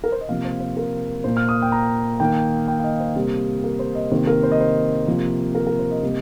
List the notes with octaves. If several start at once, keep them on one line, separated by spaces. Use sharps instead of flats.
A#4
C5
D#5
C3 F3 A#3 F5
C5
C5
A#4
A#2 A#3 C5
F6
D#6
G5
A#5
D#3 A#3 G5
G5
F5
D#5
C5
C3 G3 A#3
A#4
C5
D#5
C3 D#3 A#3 C5
A#4
C5
D#5
C5
C3 F3 A#3
A#4
A#4
C5
D#5
C3 G3 A#3